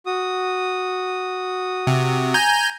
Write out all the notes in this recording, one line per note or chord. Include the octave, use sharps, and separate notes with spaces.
F#4 D#6
C3
G#5 A#5 G6